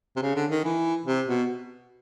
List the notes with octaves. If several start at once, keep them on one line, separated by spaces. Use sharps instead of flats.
C3
C#3
D3
D#3
E3
C3
B2